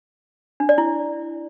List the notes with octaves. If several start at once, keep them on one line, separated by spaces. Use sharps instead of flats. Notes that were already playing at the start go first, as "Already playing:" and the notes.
D4
D5
E4